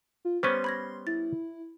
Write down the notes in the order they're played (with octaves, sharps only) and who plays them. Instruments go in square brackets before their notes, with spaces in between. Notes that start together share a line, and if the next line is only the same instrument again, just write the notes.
[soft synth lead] F4
[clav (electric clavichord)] G3 B3 C#4 [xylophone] C5 C#6 D#7 [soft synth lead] C6
[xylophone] B5 G#6 A#6
[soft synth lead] E4 [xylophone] A6